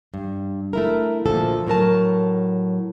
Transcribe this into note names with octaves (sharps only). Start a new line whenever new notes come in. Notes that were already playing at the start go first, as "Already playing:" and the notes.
G2
A3 E4 A#4
D2 A#2 F3 A4
A2 F#3 A#4 A5